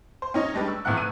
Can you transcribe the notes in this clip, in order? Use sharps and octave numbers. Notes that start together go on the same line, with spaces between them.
C5
C#4 D#4 C#5 D#5
G3 G#3 D4 G4 B4
C#6 E6
G#1 E2 C3 A3 F#5 F#6
D#7